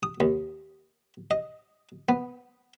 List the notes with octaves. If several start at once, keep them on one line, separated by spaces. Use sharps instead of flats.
D#6
D#2
D#5
B3